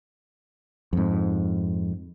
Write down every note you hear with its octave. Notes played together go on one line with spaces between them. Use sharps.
F2 G#2